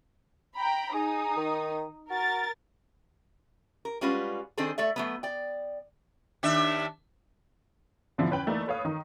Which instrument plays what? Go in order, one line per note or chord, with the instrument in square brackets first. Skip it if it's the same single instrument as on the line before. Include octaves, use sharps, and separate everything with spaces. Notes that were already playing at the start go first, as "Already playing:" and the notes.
[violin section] G5 A#5 B5
[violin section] D#4 D#6 [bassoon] G#4
[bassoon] D#3
[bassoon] F#4 [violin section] A#4 A6
[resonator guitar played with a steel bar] A#4
G3 G#3 C#4 F4 F#4 B4
D#3 C4 D4 D#4 G#4 A4
A3 A4 D5 E5
F#3 A3 B3
D5 G5
[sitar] D#2 D4 E5
[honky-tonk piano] G#2 B2 D3 E3 F3 E4
C#4 B4 G5 F#7
E3 A3 A#3 D#4 B4 D5
A4 B4 C#5 F5 D#6
D#3 D#4 D#6